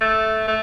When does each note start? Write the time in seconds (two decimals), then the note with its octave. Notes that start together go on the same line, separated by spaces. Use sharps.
0.01 A3
0.48 A3